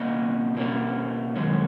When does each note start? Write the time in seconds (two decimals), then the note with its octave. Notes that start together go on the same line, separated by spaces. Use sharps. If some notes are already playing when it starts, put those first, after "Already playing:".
Already playing: B2 A#3 C#4 D#5
0.55 B2 A#3 C#4
1.36 F#2 D#3 G#3 C#4